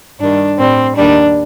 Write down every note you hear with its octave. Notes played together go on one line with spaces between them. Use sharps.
G2 D#3 G3 D4
A2 G3 C4
D#2 D#3 G3 D4